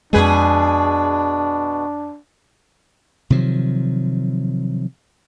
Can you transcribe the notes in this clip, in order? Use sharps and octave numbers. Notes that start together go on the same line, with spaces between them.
F2 B2 G#3 D4 G#4 B4
C3 D#3 F3 F#3